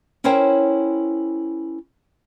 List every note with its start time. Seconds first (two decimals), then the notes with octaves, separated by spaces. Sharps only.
0.24 C#4 E4 A#4 C5 C#5 G5